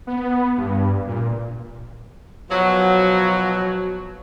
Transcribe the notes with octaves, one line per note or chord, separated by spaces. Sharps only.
B3
G2
A#2
B2 F3 F#3